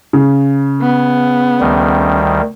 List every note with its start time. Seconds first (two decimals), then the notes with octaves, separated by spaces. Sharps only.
0.13 C#3
0.82 B3
1.60 D2 D#3 G3